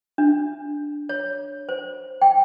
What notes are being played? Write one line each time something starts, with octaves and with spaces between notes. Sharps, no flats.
D4
C#5
C5
G5